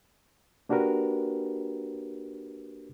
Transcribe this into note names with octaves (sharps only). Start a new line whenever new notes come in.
A#3 D4 F#4 G4 A#4 B4